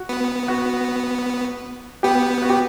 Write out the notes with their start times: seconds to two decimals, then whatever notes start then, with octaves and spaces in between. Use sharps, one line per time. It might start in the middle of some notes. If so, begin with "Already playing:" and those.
Already playing: F#4
0.09 B3
0.48 F#4
2.03 B3 G4
2.43 F#4
2.50 G4